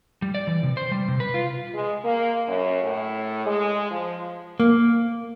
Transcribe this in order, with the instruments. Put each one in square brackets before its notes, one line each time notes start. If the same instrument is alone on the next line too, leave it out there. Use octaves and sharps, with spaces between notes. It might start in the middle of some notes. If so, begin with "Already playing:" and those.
[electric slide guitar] G3
D5
E3
C3
C5
G3
C3
B4
F4
[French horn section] G#3
A#3
F#2
A2
G#3
F3
[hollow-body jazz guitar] A#3